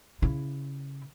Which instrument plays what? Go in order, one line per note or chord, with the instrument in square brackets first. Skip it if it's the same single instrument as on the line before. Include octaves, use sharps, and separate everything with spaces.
[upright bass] C#3 E4